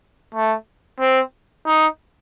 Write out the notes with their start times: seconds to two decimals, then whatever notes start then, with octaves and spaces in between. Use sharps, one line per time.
0.35 A3
1.00 C4
1.67 D#4